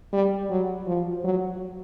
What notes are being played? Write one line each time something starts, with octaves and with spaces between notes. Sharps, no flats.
G3
F#3
F3
F#3